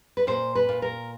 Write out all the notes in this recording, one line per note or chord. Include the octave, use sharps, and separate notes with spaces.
B4
A#2 C5
B4
A#2
A#4